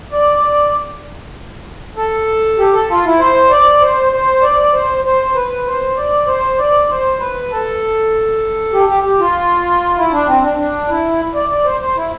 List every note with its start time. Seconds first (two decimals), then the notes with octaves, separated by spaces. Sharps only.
0.12 D5
1.96 A4
2.58 G4
2.73 A4
2.89 F4
3.04 E4
3.19 C5
3.50 D5
3.81 C5
4.12 C5
4.42 D5
4.73 C5
5.04 C5
5.35 B4
5.66 C5
5.96 D5
6.27 C5
6.58 D5
6.89 C5
7.19 B4
7.51 A4
8.73 G4
8.88 G4
9.04 G4
9.19 F4
9.96 E4
10.11 D4
10.27 C4
10.42 D4
10.57 D4
10.88 E4
11.34 D5
11.49 D5
11.65 C5
11.80 C5
11.96 E4